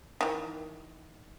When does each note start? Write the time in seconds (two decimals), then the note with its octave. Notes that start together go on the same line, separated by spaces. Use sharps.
0.21 D#3 E3